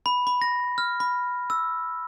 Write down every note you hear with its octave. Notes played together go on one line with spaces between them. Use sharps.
B5
B5
A#6
F6
B5
E6